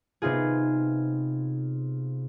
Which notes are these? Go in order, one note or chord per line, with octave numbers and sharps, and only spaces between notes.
C3 B3 D#4 F4 G#4